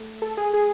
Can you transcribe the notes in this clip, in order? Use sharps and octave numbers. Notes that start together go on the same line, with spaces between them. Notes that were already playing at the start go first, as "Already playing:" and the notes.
Already playing: A3
A4
G#4
G#4